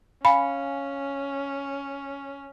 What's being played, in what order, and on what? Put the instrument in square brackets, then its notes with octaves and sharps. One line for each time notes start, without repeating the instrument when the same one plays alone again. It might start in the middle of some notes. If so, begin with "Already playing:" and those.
[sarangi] C#4 [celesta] F5 G#5 C#7 [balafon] B5